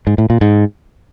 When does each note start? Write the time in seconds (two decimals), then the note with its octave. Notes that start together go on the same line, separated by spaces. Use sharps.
0.07 G#2
0.18 A2
0.30 A#2
0.41 G#2